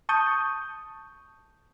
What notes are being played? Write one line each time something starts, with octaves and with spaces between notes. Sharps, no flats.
A5 C#6 D#6 G6